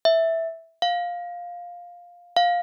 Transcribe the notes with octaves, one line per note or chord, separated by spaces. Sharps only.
E5
F5
F5